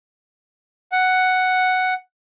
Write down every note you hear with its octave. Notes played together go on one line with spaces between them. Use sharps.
F#5